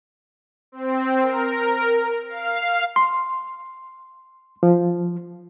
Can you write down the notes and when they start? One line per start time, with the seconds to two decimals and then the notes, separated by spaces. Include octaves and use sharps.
0.72 C4
1.22 A#4
2.29 F5
2.96 C6
4.63 F3